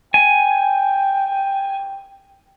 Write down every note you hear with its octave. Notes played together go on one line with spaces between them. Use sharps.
G5 G#5